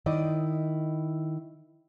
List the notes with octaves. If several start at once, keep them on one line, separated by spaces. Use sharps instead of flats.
D#3 E4 D5 D#5